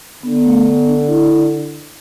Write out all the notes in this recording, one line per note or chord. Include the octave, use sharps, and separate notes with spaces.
D3 B3
B3
A3
B3
D4
E4